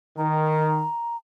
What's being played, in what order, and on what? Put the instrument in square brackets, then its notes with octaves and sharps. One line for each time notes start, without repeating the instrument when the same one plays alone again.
[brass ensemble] D#3 [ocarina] A#5